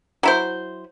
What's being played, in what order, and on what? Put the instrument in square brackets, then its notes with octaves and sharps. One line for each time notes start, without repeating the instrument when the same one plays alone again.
[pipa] F#3 E4 C5